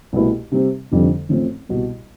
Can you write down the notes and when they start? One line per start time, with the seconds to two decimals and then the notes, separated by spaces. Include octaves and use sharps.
0.13 C2 B2 A3 E4 B4
0.52 C3 G3 C4 G4
0.92 F1 F2 D3 G3 C4
1.29 A1 A2 F3 C4
1.69 C2 B2 G3